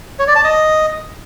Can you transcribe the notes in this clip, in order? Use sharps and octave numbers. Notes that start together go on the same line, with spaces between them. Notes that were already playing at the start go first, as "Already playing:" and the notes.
C#5
D5
A5
D#5